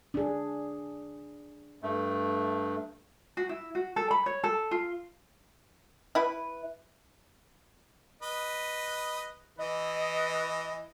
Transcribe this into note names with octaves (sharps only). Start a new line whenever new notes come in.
D4 G#4
G2 A3
F#4
E4
F#4
A4
B5
C#5
A4
F4
E4 B4
B4 D#5
E3 B4 D#5